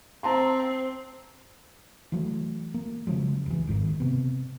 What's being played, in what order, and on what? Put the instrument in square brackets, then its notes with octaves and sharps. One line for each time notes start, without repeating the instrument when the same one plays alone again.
[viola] C4 [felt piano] A5 A#5 C6
[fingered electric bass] E3 F#3 A3
A#3
C#3 F3 F#3 G#3
D#1 E3
G1 G#2 D3 D#3
C3 B3